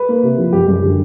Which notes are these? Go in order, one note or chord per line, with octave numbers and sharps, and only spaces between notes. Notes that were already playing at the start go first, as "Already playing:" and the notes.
Already playing: B4
A#3
C3
F3
F#2 G4
F#2 G4
D3